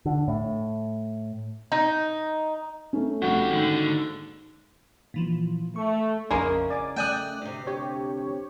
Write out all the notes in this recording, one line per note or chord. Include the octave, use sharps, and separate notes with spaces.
D3
A2
D#4
A3 C#4
F1 G2 F#4 G4
D#2 G#2 D3
A#2 E3 F3
A3 C#6
A#1 F2 C#3 G#3 A#3 C#4 E4
D5 G#5 D6
A3 D5 G5 G#5 D#6 F#6
D2 C3
G4 C#5